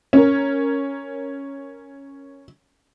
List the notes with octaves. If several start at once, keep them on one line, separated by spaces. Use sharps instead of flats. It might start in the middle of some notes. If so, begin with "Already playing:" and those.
C#4 A#4